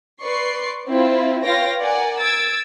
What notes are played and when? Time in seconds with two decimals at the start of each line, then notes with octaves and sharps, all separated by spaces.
0.24 B4 D5 C6 C#6 C7
0.87 C4 E4 F4
1.44 F4 B4 C#5 F5 G5 A#6
1.80 A#4 D5 F#5 G#5
2.20 E6 G#6 A6 D7